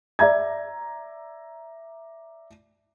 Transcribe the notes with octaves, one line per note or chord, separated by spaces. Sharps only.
D5 E5 A#5 G#6